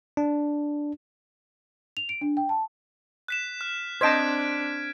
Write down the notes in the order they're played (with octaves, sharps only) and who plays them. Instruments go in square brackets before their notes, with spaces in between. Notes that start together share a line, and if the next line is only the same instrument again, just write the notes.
[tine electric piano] D4
[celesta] F7
D7
D4
G5
A5
[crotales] F#6 B6 E7
F6
[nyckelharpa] C4 D4 [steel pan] C5 D#5 A5 [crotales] G#6 B6 D7